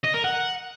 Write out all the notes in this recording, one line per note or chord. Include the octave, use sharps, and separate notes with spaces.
D#5
A#4
F#5